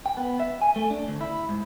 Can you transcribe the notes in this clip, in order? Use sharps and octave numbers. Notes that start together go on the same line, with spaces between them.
G5
B3
E5
G#5
A3
D4
D2
E4
G#2